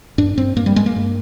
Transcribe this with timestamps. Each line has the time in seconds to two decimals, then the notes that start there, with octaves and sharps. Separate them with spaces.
0.18 G2 D4
0.37 G2 C4
0.56 G2 A#3
0.66 G3
0.76 G2 G#3
0.86 A#3
0.96 G2